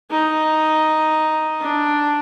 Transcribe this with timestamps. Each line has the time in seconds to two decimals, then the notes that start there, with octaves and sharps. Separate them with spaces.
0.11 D#4
1.61 D4